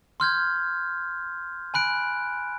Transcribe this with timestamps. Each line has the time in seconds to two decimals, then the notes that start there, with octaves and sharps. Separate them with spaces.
0.20 C6 F6 G6 G#6
1.74 G#5 B5 F#6 D7